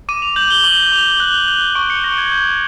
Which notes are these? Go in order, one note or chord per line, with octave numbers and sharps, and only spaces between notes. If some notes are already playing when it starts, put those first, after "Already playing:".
D6 D#7
F7
G6 F#7
G7
D6 F#7
D6 F7
F#6 G7
F#6 G7
C#6 D7
C#7
F#6 A#6
G#6
G6 G#6